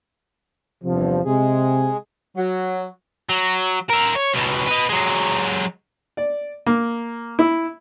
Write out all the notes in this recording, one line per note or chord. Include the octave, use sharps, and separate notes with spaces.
E2 G2 C3 F3
C3 G#3 G#4
F#3
F#3
A#4 E5
C#5
C#2 B2
B4 D#5
F#3 G#3
D5
A#3
E4